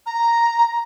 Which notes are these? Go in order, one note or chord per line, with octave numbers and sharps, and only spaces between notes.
A#5